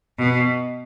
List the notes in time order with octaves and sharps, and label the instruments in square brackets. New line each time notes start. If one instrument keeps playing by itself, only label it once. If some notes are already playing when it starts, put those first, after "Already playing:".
[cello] B2